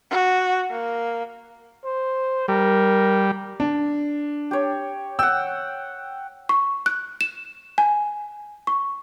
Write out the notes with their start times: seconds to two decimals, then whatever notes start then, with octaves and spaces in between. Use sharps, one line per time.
0.11 F#4
0.71 A#3
1.85 C5
2.48 G3 A#4
3.60 D4
4.51 G4 C#5
5.19 F#5 G5 E6
6.49 C#6
6.86 F#6
7.21 E7
7.78 G#5
8.67 C#6